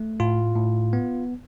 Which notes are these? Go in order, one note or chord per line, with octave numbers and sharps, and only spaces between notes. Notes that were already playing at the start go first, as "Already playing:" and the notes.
Already playing: A3
A2 F4
A2
B3